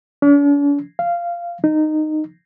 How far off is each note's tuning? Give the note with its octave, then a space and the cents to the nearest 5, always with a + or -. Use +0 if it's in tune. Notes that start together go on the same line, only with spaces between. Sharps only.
D4 -45
F5 -15
D#4 -15